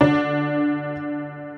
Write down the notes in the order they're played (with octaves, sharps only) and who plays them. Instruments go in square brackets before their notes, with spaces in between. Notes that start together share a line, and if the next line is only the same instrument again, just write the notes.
[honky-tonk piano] D3 D4